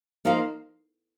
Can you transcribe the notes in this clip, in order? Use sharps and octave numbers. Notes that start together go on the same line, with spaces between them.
F3 A#3 D#4 A#4 F5